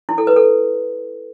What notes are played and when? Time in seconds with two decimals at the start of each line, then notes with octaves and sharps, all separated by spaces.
0.09 E4
0.18 A4
0.27 B4
0.36 A4